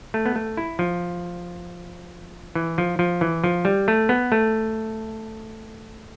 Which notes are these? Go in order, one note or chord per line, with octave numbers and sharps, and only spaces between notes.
A3
B3
A3
E4
F3
E3
F3
F3
E3
F3
G3
A3
B3
A3